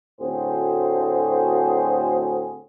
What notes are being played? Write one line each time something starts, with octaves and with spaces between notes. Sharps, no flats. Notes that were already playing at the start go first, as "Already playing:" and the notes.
D2 A2 C4 F#4 G#4 C5